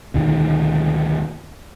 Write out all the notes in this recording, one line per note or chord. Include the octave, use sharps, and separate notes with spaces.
D2 B2 D#3